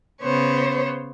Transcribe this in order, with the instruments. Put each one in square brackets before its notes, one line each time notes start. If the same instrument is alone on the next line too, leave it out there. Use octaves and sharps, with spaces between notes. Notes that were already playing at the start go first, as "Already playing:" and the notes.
[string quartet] C#3 B3 C5 C#5